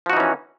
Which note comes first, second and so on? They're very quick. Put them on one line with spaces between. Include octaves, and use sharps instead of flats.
F3 F#4 D#4 E3 C#4